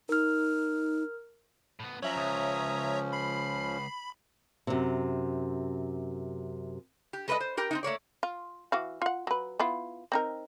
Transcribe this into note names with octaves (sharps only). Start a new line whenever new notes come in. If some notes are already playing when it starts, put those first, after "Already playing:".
D#4 A#4 F6
A2 B3
F3 F#3 C#4 C#5 E5 A#5 F#7
C#2 D#6
B5 C7
F#2 C3
G4
G#3 A4 B4 C5 D5 D#5
C5
G4 A#4 G5
C4 D4 D#4
A3 A#3 C#5 D5
F4
E3 F#4 F5
F4 F#5
F#3 B4
B3 E4 F4
C4 D#4 A#4